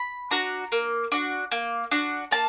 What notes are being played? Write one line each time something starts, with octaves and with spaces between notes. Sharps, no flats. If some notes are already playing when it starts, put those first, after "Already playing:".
Already playing: B5
D4 F#4 A#5
A#3
D4 F#4
A#3
D4 F#4
A#3 A5